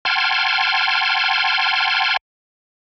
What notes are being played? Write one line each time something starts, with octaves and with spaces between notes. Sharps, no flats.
F#5 G5 A5 C6 F6 G#6